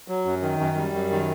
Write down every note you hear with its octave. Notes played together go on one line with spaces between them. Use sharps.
F#3
F#2
D#3
F#2
G3
F#2
D#3